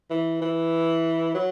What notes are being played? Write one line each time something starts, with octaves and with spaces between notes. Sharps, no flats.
E3
E3
F#3